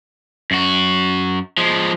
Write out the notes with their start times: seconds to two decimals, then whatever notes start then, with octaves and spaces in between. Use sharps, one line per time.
0.51 F#2 F#4
1.58 F3 G#3